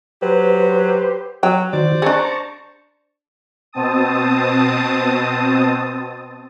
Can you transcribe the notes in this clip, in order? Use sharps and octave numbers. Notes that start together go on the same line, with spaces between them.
F#3 G4 B4 C5
F#3 G5
D#3 F#4 C5 D5
D4 G#4 A5 A#5 C#6
B2 C4 A5 D#6